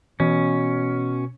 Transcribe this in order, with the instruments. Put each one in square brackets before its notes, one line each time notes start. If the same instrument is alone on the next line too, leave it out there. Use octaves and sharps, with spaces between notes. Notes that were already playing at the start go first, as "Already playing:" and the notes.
[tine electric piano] B2 [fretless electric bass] E3 [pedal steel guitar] C#4